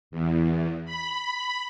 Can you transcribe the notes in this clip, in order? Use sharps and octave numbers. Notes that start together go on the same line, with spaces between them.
E2
B5